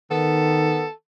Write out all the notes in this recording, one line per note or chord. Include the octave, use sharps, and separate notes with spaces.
D#3 B3 A4